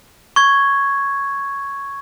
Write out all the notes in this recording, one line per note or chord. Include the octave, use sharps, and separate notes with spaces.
C#6 G#6